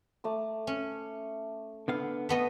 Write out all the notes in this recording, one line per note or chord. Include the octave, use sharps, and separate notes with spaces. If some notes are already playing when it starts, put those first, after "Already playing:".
A3 D6 D#6
C#4
D3 B3 F5
A3 B3 D#5